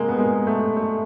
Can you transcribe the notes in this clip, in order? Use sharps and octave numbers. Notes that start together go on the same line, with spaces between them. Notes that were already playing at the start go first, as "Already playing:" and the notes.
Already playing: C3 G#3 A#3
B3
G#3 A#3
A3
A3